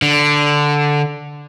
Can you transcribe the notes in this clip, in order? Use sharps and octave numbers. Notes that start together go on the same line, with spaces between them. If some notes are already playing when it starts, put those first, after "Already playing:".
D3